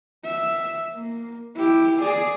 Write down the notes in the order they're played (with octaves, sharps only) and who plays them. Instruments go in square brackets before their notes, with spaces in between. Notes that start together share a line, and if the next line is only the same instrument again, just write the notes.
[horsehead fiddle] E5
A#3
E4 G4
G#4 D5